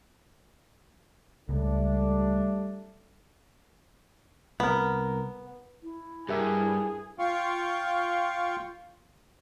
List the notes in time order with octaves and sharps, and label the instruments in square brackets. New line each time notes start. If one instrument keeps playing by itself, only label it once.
[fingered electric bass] C#2 [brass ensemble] G3 A3 D4
[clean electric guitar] C2 A#4 [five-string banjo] B3
[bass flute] E4
[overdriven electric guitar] G2 [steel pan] G4 A#4 E5 [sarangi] G#4
[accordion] F4 F5 G5 C6 C#6